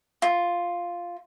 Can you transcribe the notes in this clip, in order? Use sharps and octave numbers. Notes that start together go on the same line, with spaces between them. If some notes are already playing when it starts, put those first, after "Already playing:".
F4